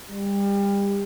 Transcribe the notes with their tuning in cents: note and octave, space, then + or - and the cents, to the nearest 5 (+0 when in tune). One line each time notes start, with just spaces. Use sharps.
G3 +30